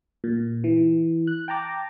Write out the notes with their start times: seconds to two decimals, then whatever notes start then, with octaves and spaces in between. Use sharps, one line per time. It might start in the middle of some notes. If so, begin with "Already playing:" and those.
0.24 A#2
0.64 E3
1.27 F#6
1.48 G5 A5 A#5 D6